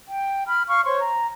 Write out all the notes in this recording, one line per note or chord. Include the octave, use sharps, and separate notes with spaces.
G5
B5 F6
F5 C#6 F6
C5 C#5 C6 C#6
A#5